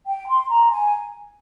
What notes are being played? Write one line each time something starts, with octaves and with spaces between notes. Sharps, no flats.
G5
C6
A#5
G#5